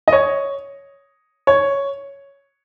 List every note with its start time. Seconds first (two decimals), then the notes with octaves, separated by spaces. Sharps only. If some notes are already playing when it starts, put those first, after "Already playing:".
0.08 D#5
0.13 C#5
1.47 C#5